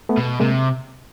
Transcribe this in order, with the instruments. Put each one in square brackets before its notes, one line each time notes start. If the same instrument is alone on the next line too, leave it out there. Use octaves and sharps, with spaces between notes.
[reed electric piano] A3 B3
[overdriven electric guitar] B2
[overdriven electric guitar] C3 [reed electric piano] G#3 A#3